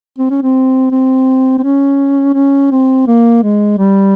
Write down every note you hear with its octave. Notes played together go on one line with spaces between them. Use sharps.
C4
C#4
C4
C4
C4
C#4
C#4
C4
A#3
G#3
G3